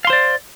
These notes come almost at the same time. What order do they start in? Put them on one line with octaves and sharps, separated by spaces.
F5 C6 C5 D5